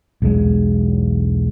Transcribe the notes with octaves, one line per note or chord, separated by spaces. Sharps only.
B1 E2 F#3 G#3